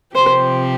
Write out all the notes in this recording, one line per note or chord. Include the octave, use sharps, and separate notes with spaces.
C3 F3 C4 G4 C5